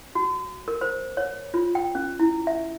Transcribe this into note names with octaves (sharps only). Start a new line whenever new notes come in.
F#4
A#4
C5
C#5
F4
G5
C#4
E4
E5